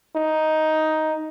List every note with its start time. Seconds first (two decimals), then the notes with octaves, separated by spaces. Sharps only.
0.16 D#4